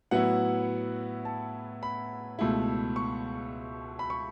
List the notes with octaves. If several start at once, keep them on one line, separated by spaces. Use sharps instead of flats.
A2 F#3 B3 E4 F#5
A5
B5
C#2 B2 A3 E4
C#6
B5
C#6